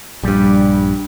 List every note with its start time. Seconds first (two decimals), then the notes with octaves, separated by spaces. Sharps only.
0.23 A#1 G2 G3